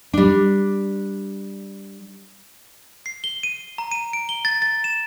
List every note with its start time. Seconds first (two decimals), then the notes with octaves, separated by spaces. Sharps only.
0.13 G3 D4
3.06 C7
3.24 G7
3.43 D#7
3.78 A#5
3.92 D#7
4.13 D7
4.29 G7
4.45 A6
4.62 A6
4.84 E7